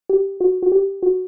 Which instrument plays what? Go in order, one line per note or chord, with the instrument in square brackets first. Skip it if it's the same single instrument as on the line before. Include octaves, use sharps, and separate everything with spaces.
[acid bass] G4
F#4
F#4
G4
F#4